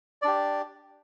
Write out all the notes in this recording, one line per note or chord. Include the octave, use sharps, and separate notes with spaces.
D4 G4 D5